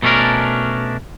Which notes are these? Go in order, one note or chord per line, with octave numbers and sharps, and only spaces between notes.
B2 A3 C#4 D4 A#4